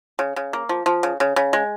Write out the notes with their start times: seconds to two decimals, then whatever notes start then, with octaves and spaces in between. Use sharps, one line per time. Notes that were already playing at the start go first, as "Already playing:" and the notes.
0.19 C#3
0.36 C#3
0.53 A#3
0.69 F3
0.86 F3
1.03 C#3
1.20 C#3
1.36 C#3
1.53 G#3